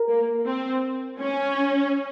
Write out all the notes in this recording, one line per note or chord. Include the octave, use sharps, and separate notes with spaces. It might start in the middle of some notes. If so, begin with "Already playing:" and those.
Already playing: A#4
A#3
C4
C#4